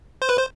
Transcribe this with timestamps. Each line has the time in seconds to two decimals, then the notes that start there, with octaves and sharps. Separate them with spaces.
0.22 C5
0.29 B4
0.38 C5